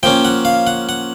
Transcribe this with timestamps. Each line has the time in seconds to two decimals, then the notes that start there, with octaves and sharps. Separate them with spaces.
0.03 F3 A#3 C#4 G5
0.25 F#5
0.45 F5
0.67 F#5
0.89 F#5